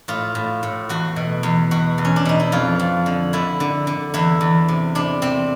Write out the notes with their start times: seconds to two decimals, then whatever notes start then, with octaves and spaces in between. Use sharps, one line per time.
0.08 A2 F4
0.35 A2
0.63 A2
0.89 E2 F#4
1.16 B2
1.43 E2
1.71 B2 F#4
1.98 E2
2.05 C#4
2.16 D4
2.25 B2 D#4
2.40 E4
2.52 F2 F4
2.79 F2
3.06 D3
3.33 D3 E4
3.60 D3
3.87 D3
4.14 E2 E4
4.41 E2
4.68 C3
4.95 C3 D4
5.22 C3 C4